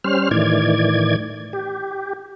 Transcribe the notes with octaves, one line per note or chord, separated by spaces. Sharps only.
G3 C#4 C5 F6
A2 D#3 E3 D5 G#6
G4